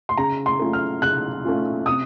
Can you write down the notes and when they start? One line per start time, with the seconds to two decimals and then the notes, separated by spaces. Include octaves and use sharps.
0.09 C6
0.17 C#3 A#5
0.46 C6
0.59 A3 C#4 F4
0.73 F6
1.02 C#3 F#6
1.44 A3 C#4 F4
1.86 C3 D#6